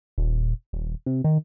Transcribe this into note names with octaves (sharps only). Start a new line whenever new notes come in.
D#1
D#1
C3
D#3